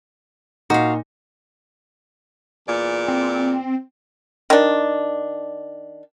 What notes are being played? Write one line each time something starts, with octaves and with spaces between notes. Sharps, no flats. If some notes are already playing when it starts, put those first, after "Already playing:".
A#2 D#4 F#4 F5
E2 A#2 D5
C4
D#3 D4